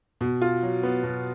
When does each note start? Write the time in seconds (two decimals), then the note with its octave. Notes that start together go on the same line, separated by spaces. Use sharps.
0.21 B2
0.42 F4
0.63 F#3
0.83 B3
1.03 B2